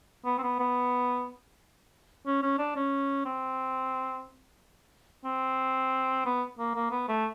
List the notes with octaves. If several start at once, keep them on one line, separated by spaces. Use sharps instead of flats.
B3
C4
B3
B3
C#4
C#4
D4
C#4
C4
C4
B3
A#3
A#3
B3
A3